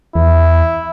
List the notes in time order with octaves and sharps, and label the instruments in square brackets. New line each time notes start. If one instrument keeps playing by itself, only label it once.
[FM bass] E2 [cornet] E4